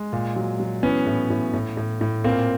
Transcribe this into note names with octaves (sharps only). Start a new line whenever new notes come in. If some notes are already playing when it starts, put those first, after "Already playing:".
Already playing: G#3
A#2
F#3
F#3
E3 B3 C#4
A2
A2
A2
A2
A2
A#2 A#3 C4